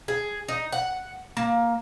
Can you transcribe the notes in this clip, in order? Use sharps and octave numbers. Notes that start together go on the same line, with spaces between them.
G#4
D#4
F#5
A#3